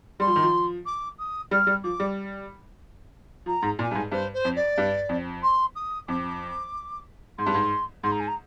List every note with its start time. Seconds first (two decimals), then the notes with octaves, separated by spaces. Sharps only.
0.20 G3 C6
0.27 F3
0.36 D#3
0.43 F3
0.86 D6
1.18 D#6
1.51 G3 F6
1.67 G3
1.83 F3 D6
2.00 G3
3.46 F3 A#5
3.62 G#2
3.79 A#2 G#5
3.91 G2
3.95 G#2
4.12 G2 C5
4.33 C5
4.45 F2
4.56 D5
4.78 G2
5.09 F2
5.43 C6
5.75 D#6
6.08 F2 D6
7.38 G#2 C6
7.46 G2
7.54 G#2
8.03 G#2 C6
8.11 A#5
8.20 G#5
8.27 A#5